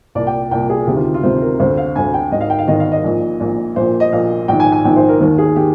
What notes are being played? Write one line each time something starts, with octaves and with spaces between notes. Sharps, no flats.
C2 A#2 D5
G5
C2 A#2 G5
G#4
D2 C3 D#3 G4
F4
F4
D2 C3 D#3 C5
A#4
D2 D3 C5
F5
D2 D3 G#5
G5
G#1 G#2 D#3 D#5
F5
G5
F5
G#1 G#2 D#3 D#5
F5
D#5
A#1 A#2
A#1 A#2
A#1 A#2 C5
D#5
A#1 A#2 F5
A#1 G#2 D#3 G5
G#5
G#5
A#1 G#2 D#3 G5
C5
A#4
D#2 D#3 A#4
G#4
D#3 G4